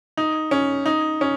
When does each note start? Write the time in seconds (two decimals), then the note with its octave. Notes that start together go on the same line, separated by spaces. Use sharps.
0.17 D#4
0.51 C#4
0.86 D#4
1.21 C#4